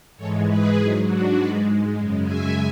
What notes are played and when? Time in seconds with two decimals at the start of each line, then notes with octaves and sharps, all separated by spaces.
0.17 G#2 E3 G#3 A4 C#5
0.46 G#4 B4
0.76 G#2 F#3 E4 G#4
1.05 D4 F#4
1.35 G#2 G#3 B4 D5
1.94 F#2 C#3 G#3
2.24 E5 G#5